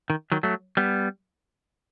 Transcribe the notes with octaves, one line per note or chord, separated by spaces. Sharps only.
D#3
D#3 F#3
F#3 A3
G3 B3